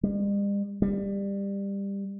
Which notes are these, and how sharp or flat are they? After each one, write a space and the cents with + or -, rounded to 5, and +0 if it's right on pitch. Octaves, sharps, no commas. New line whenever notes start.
G3 +45
G3 +20